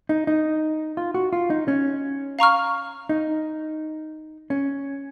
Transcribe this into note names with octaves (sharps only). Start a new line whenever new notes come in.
D#4
D#4
F4
F#4
F4
D#4
C#4
F5 A#5 C#6 F6
D#4
C#4